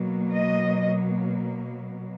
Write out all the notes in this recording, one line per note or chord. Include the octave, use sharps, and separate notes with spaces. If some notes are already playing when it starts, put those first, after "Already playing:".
Already playing: B2 F#3 A#3
D#5